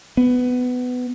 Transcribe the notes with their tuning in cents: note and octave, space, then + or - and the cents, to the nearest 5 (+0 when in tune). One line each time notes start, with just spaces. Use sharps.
B3 +15